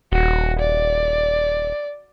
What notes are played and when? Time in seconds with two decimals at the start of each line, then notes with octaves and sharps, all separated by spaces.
0.12 D#1 F#4
0.59 D5